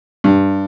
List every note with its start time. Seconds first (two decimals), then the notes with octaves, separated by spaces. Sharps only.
0.24 G2